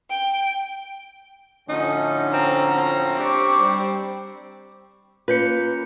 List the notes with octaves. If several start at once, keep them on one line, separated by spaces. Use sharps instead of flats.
G5
A2 D3 F3 C#4 D#4
C4 A#5
C4
D4 G4 C#6 D6
G3
A#3 C#4 F4 B4 G6 C#7